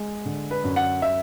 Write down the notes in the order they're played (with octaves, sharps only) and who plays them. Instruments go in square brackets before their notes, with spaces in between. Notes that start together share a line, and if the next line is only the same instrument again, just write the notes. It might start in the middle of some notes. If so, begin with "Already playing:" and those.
Already playing: [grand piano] G#3
D3
B4
F#2
F#5
E5